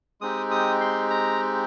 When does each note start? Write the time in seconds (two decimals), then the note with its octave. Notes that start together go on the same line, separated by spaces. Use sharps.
0.21 G#3 C4 D#4 G4 D#6
0.51 D#6
0.81 C6
1.10 A#5